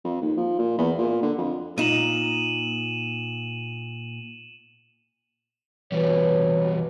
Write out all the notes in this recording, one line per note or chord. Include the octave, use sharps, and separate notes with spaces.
F2
D#2
F3
A#2
E2
A#2
D3
F2
A#2 D#4 D#7 E7 F#7
B2 E3 G3 G4 B4 C#5